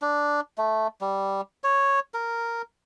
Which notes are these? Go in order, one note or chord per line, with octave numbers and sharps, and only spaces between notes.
D4
A3
G3
C#5
A#4